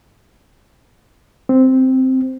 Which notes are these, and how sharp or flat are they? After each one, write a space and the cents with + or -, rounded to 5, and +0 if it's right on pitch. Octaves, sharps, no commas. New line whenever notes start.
C4 -5